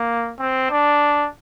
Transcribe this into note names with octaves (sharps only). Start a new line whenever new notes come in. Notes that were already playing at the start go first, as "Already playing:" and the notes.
Already playing: A#3
C4
D4